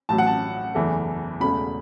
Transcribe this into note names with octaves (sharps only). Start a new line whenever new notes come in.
A1 A2 F#3 A5
F#5
A5
F#1 E2 E3 A3
E1 E2 C#3 A3 B5